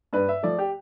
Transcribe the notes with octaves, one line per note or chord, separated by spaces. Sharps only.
G2 B4
E5
F3 A3 D5
G4